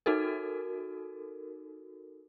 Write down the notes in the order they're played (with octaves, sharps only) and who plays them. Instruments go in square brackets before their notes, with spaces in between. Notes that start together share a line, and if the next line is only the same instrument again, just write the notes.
[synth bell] D#4 F#4 A4 A#4